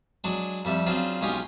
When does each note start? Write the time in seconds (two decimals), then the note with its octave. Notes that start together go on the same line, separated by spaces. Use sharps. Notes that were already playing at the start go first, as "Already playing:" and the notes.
0.24 F#3 G#3 D4
0.65 F2 G3 E5
0.86 C#3 F#3 C4 D4 F4
1.21 B1 G#3 C#4 F4 G4 D#6